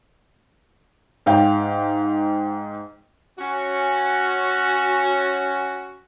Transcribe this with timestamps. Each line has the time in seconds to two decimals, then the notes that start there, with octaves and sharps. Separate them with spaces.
1.26 G#2 F5 G5
3.39 C#4 F#4